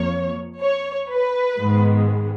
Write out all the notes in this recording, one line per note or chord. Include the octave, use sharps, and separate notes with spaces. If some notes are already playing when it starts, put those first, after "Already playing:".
Already playing: F2 F3 A#3 C#5
C#5
B4
G#2 D#3 G#3 B3